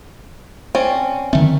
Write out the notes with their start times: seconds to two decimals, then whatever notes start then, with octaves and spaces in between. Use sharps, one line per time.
0.75 C4 C#4 D5
1.33 D3 D#3 A3 C4